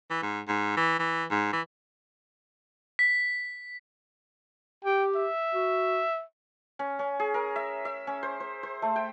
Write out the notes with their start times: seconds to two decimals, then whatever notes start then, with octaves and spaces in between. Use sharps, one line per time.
0.10 E3
0.23 G#2
0.48 G#2
0.77 E3
0.99 E3
1.31 G#2
1.53 E3
2.99 B6
4.84 G4 G5
5.15 E5
5.54 F#4
6.79 C#4
6.99 C#4
7.19 G#4
7.34 A#4
7.56 E5
7.85 E5
8.07 C#4
8.23 C5
8.40 C5
8.63 C5
8.82 A3
8.96 G5